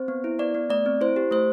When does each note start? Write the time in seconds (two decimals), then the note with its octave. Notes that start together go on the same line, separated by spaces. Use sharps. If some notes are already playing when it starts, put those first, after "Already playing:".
Already playing: C4 C5
0.08 B3
0.24 E4
0.39 B3 D5
0.54 B3
0.70 A3 D5
0.86 C4
1.01 E4 C5
1.16 G4
1.31 A3 C5